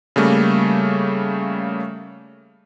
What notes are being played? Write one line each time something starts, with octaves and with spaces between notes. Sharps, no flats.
C#3 G3 A3 A#3